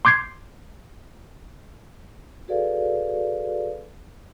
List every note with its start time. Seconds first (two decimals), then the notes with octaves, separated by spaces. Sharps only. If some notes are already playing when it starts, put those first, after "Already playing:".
0.05 C6 D6 G6 G#6 C7
2.48 F#4 G#4 A4 B4 D5 F5